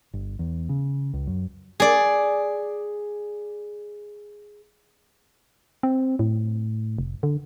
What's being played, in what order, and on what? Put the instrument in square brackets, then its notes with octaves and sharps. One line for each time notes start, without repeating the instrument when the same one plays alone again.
[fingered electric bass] G1
E2
C#3
C#2
F#2
[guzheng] G#4 D5
[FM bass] C4
A2
F1
D3